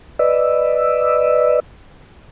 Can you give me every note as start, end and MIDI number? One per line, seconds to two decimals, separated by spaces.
0.19 1.60 71
0.19 1.60 74
0.19 1.60 75
0.19 1.60 88